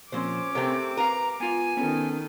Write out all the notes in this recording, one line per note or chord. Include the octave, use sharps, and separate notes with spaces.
A#2 F3 A#3 C4 C#4 C5 D6
C3 A3 C4 G4 A#4
A#4 B4 F5 A#5
B3 F4 G#5
D#3 B3 C#4 A4